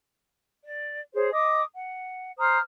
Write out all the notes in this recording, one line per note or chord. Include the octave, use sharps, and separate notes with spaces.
D5
G#4 C5 C#5
D#5 D6 D#6
F#5
C5 A#5 D#6 F6